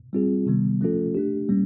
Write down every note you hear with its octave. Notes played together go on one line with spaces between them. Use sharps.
G3 C4 F4 G#4
C3 D#3 G3 B3
F3 A3 C#4 F4 A4
A3 D4 G4
G3 A#3 C#4